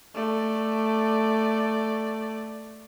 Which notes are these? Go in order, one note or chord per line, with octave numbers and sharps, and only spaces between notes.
A3 D5